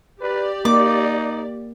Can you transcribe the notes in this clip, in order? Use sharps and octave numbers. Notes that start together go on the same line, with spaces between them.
G4 B4 D5
A#3 D#4 D6